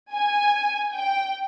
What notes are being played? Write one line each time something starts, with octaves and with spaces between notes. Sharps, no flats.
G#5
G5